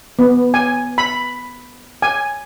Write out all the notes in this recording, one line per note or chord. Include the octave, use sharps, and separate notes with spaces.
B3
G#5
B5
G#5